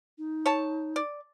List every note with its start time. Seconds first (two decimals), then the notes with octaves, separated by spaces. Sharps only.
0.18 D#4
0.46 C#5 A5
0.96 D5